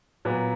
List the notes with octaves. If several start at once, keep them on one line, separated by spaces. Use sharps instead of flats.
A#2 F#3 B3